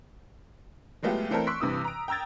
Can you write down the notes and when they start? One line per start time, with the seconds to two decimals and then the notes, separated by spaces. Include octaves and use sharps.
1.03 F#3 G#3 A3 B3 F4 G4
1.30 E3 A3 C4 D4 A4 A#4
1.47 C6 C#6 E6 F#6 B6 D7
1.60 G2 C3 E3 D#6 E6
1.85 A#5 D7
2.08 G5 A#5 E6 G#6 A6